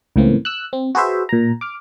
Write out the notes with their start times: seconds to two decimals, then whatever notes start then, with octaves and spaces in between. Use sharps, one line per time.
0.16 C#2 A2 E3 A#3 C4
0.45 E6 F#6
0.73 C4
0.95 F#4 G#4 B4 C5 E5
1.29 A#2 A#5
1.61 D6 F6